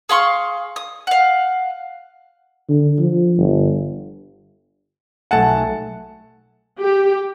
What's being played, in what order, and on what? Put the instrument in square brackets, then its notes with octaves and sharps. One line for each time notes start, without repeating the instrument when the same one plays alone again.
[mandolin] G#4 F5 C6 C#6
D#6
F5 F#5
[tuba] D3
F3
G1
[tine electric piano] B1 A3 G#5 [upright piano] F#5 A5
[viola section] G4